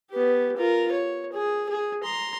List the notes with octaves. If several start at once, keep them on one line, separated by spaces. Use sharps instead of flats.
B3 G4
F4 A#4
C#5
G#4
G#4
A#5 C6